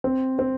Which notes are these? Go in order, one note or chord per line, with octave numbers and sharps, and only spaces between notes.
C4
C4